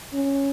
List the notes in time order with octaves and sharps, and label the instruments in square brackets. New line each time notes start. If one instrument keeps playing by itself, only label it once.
[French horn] C#4